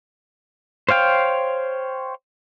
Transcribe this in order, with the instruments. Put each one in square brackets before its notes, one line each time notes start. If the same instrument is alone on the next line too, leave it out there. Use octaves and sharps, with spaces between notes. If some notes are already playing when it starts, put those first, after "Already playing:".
[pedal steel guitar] C5 C#5 F5 G5